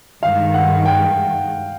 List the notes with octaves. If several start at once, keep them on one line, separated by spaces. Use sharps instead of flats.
G2 D#3 G#3 F5
F#5
G5